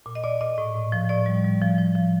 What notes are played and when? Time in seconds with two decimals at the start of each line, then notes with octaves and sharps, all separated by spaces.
0.06 A#2
0.15 D#5
0.24 A#2 D5
0.41 A#2 D#5
0.58 A2
0.75 A2
0.92 F3
1.09 A2 D5
1.26 G3
1.44 G3
1.61 F3
1.78 F3
1.95 F3